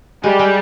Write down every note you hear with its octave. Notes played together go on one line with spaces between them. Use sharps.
G3 G#3 G4
G#3